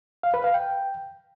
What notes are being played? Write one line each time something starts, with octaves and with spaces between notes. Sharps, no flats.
F5
B4
F5
G5